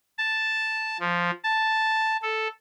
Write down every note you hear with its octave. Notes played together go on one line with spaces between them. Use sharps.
A5
F3
A5
A4